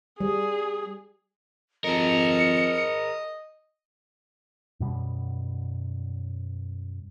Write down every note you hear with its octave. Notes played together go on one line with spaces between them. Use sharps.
G3 G#4
F2 G#4 A#4 D#5 C#7
F#2 B2 G3